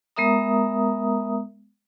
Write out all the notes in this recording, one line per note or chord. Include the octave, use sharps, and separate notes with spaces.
G#3 B3 A#4 E5 A#5 D#6